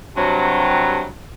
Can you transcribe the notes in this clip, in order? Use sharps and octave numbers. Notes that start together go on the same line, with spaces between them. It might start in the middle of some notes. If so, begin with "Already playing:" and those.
G2 C3 F#3